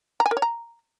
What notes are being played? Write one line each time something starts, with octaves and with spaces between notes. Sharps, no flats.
A#5
G#5
A#4
C#5
A#5